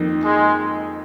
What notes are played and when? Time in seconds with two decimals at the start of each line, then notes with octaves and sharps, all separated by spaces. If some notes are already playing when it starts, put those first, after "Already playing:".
Already playing: F2 D#3 A#3 D#4
0.23 G#3